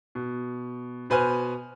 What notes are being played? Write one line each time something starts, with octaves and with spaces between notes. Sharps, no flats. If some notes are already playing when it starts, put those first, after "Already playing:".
B2
B2 B4 C5 G#5 F6